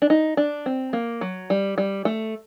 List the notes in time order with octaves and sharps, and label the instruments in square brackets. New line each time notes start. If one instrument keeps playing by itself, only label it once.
[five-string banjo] D4
D#4
D4
C4
A#3
F#3
G3
G3
A3